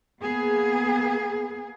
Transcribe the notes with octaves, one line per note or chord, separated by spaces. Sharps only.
A#3 B3 G#4